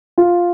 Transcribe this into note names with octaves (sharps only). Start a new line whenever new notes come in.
F4